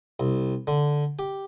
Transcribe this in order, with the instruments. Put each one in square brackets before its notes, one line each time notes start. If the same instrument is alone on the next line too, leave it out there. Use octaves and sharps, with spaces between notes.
[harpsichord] C2
D3
G4